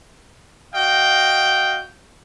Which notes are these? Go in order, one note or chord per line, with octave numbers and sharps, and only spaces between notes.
F#4 D#5 F5 G5